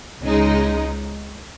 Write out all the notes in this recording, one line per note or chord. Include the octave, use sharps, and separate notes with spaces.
C#2 C#3 G#3 D#4